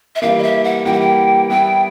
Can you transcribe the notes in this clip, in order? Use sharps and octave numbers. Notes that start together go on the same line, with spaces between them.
E5
E3 G3 A#3 F5
D#5
E5
F#5
E3 G3 A#3 G5
F#5
G5
G3 B3 E4 G5